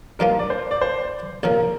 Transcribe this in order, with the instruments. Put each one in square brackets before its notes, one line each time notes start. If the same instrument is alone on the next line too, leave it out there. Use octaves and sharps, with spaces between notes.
[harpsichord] G2 F3 A#3 F4 [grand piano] A#4
[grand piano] D5
C5
D5
C5
[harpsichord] A#1 A#2 F3 [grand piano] A#4